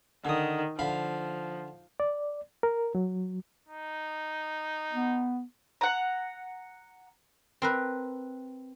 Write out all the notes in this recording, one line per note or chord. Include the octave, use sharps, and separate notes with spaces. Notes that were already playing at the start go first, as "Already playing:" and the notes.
D3 D#3 D#6
D3 F3 F5 B5
D5
A#4
F#3
D#4
B3
F#5 A#5
C4 A#4 B4